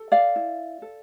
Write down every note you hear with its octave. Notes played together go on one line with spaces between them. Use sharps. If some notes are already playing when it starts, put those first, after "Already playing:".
Already playing: A4
D5 F5
E4
A4